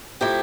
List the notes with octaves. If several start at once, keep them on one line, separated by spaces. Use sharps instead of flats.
C3 F3 A3 E4 G4